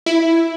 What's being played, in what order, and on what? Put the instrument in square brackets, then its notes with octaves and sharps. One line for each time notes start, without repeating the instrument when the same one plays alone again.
[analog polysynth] E4